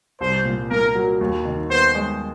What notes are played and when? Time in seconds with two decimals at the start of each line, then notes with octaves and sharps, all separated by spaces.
0.20 C2 C5
0.45 A#2
0.70 A#3 A#4
0.95 F#3
1.21 D#2
1.45 D#3
1.70 B3 C5
1.95 G#3